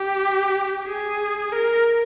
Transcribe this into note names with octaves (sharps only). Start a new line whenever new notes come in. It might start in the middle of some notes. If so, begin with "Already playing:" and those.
Already playing: G4
G#4
A#4